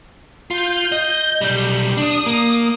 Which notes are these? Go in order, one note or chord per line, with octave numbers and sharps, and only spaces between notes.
F4 G6
D#5
B1 G3
D4 D#6
A#3